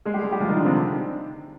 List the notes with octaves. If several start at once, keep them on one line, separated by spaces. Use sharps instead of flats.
G#3 G#4
G3 G4
G#3 G#4
G3 G4
F3 F4
D#3 D#4
D3 D4
C3 C4